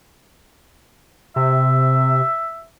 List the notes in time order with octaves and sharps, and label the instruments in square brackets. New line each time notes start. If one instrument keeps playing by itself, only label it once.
[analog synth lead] C3 [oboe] E5